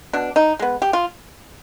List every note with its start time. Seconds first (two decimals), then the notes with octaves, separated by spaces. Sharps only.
0.13 B2 D4
0.36 D#4
0.59 G#3 B3
0.82 G4
0.93 F4